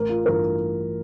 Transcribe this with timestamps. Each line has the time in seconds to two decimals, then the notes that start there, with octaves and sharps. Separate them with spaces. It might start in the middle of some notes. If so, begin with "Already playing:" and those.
Already playing: A1 A#4
0.09 F4
0.26 G2 E3 A3 A#4